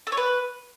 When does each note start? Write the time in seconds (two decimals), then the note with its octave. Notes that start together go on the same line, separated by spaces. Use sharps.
0.07 A4
0.12 C#5
0.17 B4